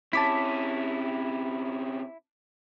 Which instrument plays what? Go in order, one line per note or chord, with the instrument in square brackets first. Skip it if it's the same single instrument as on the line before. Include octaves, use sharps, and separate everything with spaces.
[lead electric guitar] C3 C#4 [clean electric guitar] E4 [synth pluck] A5 D6 B6